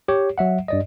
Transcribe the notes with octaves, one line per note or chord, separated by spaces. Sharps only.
G4 C#5
F#3 E5 F#5
G2 D5 D#5